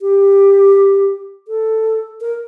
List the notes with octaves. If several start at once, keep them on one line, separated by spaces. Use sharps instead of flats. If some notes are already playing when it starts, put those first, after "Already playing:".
G4
A4
A#4